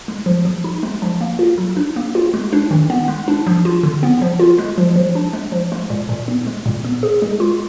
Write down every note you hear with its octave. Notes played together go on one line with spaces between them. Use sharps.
G#3
F3
F3
D#4
G#3
F3
A#3
F4
F#3
D4
A#3
F4
G#3
D4
D#3
B3
G#3
D4
F3
F4
D3
B3
F3
F4
G#3
F3
F3
D4
G#3
F3
G#3
A#2
A#2
B3
G#3
A#2
B3
G#4
G#3
F4